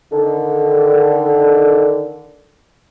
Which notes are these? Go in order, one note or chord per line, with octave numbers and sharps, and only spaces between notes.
D3 D#3